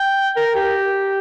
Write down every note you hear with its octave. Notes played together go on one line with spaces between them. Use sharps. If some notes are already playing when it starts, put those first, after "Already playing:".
Already playing: G5
A#4
G4